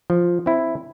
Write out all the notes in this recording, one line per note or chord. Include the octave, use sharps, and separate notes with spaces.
F3
C4 E4